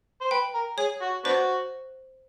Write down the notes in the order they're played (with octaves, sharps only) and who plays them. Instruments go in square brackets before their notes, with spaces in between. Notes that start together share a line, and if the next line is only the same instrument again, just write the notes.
[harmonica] C5
[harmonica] B4 [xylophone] G5
[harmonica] A#4
[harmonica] G#4 [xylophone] C#5
[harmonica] F#4
[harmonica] B3 D4 F#4 [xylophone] C5